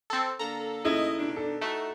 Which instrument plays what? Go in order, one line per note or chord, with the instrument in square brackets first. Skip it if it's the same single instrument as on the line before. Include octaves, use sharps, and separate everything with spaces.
[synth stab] C4 A4
[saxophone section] D3 A#3 A4 [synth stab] A#5
[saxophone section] D#2 D#5 [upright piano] C#3 A3 E4
[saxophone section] B2 D#3 D4
[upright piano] A4
[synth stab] A3 [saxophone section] D#4 E4 F#4